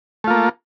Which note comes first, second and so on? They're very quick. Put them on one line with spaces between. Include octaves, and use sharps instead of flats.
A3 F4 A#3